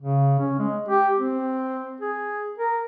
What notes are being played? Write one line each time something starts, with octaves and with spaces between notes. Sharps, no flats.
C#3
C#4
G#3
G4
C4
G#4
A#4